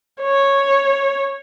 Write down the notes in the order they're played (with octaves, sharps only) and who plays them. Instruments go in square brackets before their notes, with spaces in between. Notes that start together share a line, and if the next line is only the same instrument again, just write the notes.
[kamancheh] C#5